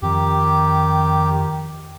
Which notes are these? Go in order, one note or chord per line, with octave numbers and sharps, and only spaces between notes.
F2 D#3 G4